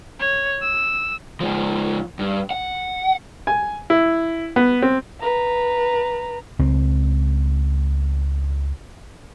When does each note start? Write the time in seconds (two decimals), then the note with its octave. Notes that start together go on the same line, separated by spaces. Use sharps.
0.20 C#5
0.62 E6
1.40 F3 G#3
2.19 G2
2.51 F#5
3.47 G#5
3.90 E4
4.56 B3
4.82 C4
5.21 B4 A#5
6.59 C#2 C4